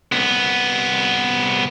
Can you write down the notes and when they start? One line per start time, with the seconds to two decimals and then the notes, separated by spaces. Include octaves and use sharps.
0.12 C2 B3